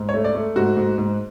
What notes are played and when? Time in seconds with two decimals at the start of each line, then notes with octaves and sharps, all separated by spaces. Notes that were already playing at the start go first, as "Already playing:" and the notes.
Already playing: G#2
0.09 C#5
0.14 A3
0.24 D5
0.35 A3
0.56 G#2 F#4
0.77 G#2
0.98 G#2